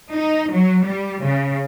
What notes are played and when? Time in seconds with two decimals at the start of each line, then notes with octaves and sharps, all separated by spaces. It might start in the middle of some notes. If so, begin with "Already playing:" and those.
0.12 D#4
0.52 F#3
0.85 G3
1.23 C#3